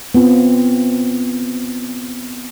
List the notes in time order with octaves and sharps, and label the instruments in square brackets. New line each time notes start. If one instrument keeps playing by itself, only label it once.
[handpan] B3 C4 F4